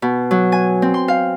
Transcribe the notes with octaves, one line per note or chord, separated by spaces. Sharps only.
B2
F#3
G#5
C4
C6
F5